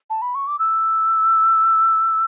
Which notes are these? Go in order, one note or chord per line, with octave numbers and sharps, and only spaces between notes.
A5
B5
C#6
D6
E6